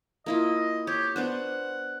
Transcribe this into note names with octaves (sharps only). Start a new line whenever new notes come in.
A#3 E4 F4 D#5
G4 C#5
B3 D4 C5 F#5